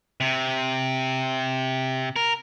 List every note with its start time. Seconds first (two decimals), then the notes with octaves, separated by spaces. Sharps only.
0.20 C3
2.16 A#4